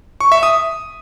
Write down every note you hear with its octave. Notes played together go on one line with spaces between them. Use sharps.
C#6
E5
D#6